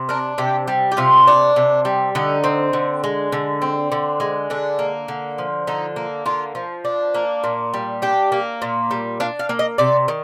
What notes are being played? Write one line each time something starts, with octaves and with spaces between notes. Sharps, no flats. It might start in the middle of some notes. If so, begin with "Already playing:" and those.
Already playing: C3
D4 A#4
C3 G4
G3
G4
C3 F4
D4
C3
G3
D3 D#4
C4
D3
G#3
D3
C4
D3
G#3
D3 D4
A#3
D3
F3
D3 D#4
A#3
D3 F4
F3
D4
A#3
A#2
G3
D4 G4
A#3
A#2
G3
D4 F5
F5
A#3
D#5
C3 D5
D#3